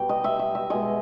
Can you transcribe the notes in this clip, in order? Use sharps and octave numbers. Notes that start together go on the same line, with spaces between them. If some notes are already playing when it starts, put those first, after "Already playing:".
Already playing: B2 G3 G5
D#5
E5
E5
E5
B2 G#3 D#5